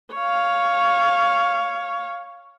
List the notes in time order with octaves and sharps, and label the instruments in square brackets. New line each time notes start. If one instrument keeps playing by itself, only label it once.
[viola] C#5 F5